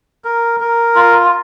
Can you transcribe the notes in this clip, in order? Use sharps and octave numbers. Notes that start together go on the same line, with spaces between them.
A#4
A#4
F4